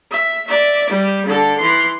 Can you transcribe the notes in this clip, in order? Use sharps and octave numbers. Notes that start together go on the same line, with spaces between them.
E5
D5 E5
G3
D3 A4
E3 C6